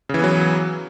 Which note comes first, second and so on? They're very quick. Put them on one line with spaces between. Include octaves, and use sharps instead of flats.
C#3 E3 B3 F#3